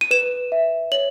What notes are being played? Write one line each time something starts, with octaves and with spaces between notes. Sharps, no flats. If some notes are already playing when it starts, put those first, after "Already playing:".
D#7
B4 E7
E5
C#5 F#7